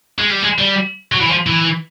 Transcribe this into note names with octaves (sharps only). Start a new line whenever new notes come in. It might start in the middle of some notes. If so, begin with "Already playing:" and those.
G#3
G3
G#3
G3
F#3
E3
F3
E3